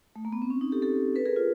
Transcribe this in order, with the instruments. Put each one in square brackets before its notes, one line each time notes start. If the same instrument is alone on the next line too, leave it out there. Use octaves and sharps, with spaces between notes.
[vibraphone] A3
A#3
B3
C4
C#4
D#4
G4 A4
G4 A4
A4 B4
G#4 A#4
F4